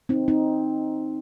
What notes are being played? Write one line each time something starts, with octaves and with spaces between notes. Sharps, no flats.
C4 D#4
C4 D#4